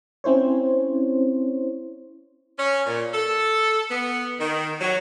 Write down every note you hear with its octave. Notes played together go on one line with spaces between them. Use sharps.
C4 C#4 E4 C5 C#5
C#4
A#2
A4
B3
D#3
F#3